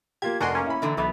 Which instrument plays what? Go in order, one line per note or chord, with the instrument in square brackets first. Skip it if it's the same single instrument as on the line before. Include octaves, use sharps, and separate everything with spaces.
[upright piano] A#3 F4 G4 [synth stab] G#6
[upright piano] F1 [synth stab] D4 F#4 C6 [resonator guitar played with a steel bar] A#4 G#5
[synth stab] A#3 C#4
[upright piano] E4 B5
[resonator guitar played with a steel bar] A#2 D3 E3
[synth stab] B1 E3 [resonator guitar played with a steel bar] A3 B3